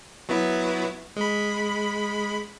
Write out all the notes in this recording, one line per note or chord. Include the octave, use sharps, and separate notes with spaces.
F#3 B3 E4
G#3 B5